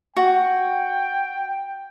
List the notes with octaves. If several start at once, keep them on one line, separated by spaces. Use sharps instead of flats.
F#4 G5